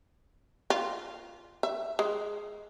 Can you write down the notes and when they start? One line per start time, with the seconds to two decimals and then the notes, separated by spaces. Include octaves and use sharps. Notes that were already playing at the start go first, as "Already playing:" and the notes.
0.70 F4
1.63 E5
1.99 G#3